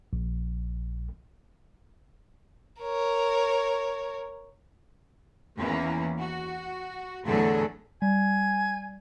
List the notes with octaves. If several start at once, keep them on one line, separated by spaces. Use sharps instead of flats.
A#1
A#4 C#5
E2 D#3 E3 A#3 C#4
F#4
E2 A2 D3 F#3 G#4 A4
G3 G#5